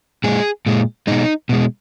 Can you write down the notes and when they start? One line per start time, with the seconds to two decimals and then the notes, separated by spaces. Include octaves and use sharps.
0.24 A#2 G#3 G#4
0.66 A#2 G#3
1.07 B2 G#3 D#4
1.49 B2 G#3